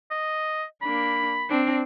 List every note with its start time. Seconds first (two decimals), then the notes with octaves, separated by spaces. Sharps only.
0.11 D#5
0.82 A#3 D4 B5
1.50 C4 D4